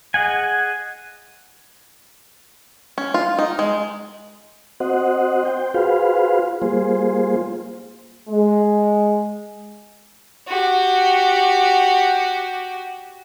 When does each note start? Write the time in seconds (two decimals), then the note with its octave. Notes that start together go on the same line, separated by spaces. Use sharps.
0.14 G#4 D#5 F#5 G#5
2.98 C#4
3.14 F4
3.39 D#4
3.59 G#3
4.80 C4 F#4 C5 D#5 F#5
5.45 C5 G5
5.74 F4 F#4 G#4 B4 C5 F5
6.62 G3 A#3 F4 G#4 C5
8.29 G#3
10.48 F#4 G4